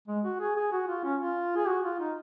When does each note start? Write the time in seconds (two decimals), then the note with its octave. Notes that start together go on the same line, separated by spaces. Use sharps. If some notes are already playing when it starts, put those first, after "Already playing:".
0.08 G#3
0.24 F#4
0.40 G#4
0.56 G#4
0.72 F#4
0.88 F4
1.04 C#4
1.20 F4
1.56 G#4
1.68 F#4
1.84 F4
2.00 D#4